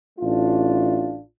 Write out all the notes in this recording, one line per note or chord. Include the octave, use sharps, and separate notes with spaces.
A1 A3 D4 F4